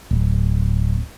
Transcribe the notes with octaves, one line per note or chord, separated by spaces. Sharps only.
D1